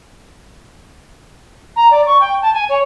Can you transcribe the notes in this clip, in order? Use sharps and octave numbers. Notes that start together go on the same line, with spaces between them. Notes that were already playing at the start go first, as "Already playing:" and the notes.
A#5
D5
C#6
G5
A5
G#5
C#5